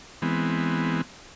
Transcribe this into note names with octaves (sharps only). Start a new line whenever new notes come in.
E3 G#3 B3 C4